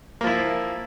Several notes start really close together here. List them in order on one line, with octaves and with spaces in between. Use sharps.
A#3 F3 E4